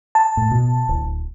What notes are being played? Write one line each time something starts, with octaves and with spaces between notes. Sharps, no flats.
A5
A2
B2
D1